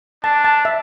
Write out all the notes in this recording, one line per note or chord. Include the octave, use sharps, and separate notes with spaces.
D4 A5
A5
E5